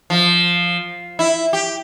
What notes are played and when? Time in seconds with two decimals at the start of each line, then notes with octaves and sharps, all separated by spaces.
0.10 F3
1.19 E4
1.53 G4